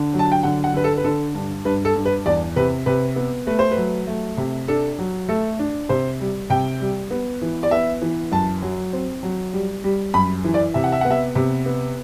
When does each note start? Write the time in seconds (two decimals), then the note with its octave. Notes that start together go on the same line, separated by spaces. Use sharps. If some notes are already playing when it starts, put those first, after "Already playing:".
Already playing: D3
0.13 F#3
0.19 A5
0.32 G5
0.43 D3 F#5
0.64 F#5
0.74 D3 B4
0.84 A4
0.97 B4
1.04 D3 A4
1.35 G2
1.65 G2 B4
1.85 A4
1.96 G2
2.05 B4
2.26 E2 D5
2.56 C3 B4
2.86 C3 B4
3.16 B3
3.47 A3 B4
3.59 C5
3.71 B4
3.77 F#3
4.07 A3
4.37 C3
4.68 D4 A4
4.99 F#3
5.29 A3 A4
5.59 D4
5.89 C3 C5
6.20 G3
6.50 C3 G5
6.80 G3
7.11 B3
7.42 E3
7.63 D5
7.71 B3 E5
8.02 E3
8.31 F#2 A5
8.62 F#3
8.93 C4
9.23 F#3
9.53 G3
9.84 G3
10.14 F#2 B5
10.44 E3
10.54 D5
10.74 C3 E5
10.84 F#5
10.92 E5
11.01 B3 F#5
11.11 E5
11.35 C3
11.66 B3